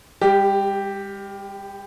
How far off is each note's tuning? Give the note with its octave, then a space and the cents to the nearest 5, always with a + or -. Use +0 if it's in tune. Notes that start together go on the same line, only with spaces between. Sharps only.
G3 +45 G4 +0